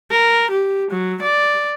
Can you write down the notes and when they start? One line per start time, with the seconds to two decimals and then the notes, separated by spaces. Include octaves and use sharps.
0.11 A#4
0.51 G4
0.91 F#3
1.22 D5